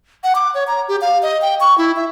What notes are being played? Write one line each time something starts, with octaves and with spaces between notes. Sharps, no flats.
F#5
D6
C#5
A#5
G4
F5
D#5
G5
C#6
E4
E5